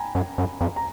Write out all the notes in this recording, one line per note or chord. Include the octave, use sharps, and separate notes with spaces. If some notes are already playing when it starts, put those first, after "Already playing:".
Already playing: G5 G#5 A#5 B5
F#2
F#2
F2
A#5